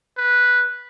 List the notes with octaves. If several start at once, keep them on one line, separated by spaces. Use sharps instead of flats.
B4